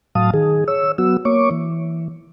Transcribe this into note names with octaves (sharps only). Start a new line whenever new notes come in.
A2 F#3 F5 A5 D#6
D#3 G#4
C#5 E6
F#3 B3 F#4 E6
A#3 C#5 C#6 D6
E3